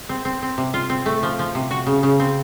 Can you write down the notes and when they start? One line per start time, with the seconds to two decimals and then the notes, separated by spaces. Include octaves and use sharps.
0.09 C4
0.25 C4
0.42 C4
0.58 C3
0.74 F4
0.90 C4
1.06 A3
1.23 F3
1.39 F3
1.55 C3
1.71 F#4
1.86 C#3
2.03 C#3
2.20 C4